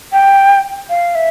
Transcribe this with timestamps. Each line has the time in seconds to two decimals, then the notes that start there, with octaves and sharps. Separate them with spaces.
0.12 G5
0.90 F5
1.15 E5